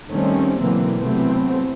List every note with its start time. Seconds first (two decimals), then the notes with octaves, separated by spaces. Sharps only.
0.11 D#3 G3 A3 C4 C#4
0.61 B2 D3 E3 F#3 A#3 C4
0.98 C3 E3 F#3 A3 B3 C4